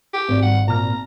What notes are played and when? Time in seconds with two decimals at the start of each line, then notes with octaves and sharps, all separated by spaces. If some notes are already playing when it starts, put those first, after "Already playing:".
0.14 G4
0.28 G#1 D5
0.43 G#2 D#3 G3 F#5
0.68 A#2 A#3 A#5 F6